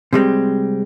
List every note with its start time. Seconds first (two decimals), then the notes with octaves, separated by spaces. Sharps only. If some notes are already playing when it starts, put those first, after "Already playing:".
0.13 C3 G3 G#3 C4